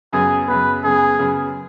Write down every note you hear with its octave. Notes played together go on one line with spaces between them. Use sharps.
F#2 C#3 B3 G#4
F#2 C#3 B3 B4
F#2 C#3 B3 G#4
F#2 C#3 B3